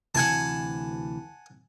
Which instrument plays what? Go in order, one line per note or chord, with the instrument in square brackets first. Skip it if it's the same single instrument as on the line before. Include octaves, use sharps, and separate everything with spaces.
[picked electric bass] D2 C3 E3 [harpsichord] F#5 G#5 A5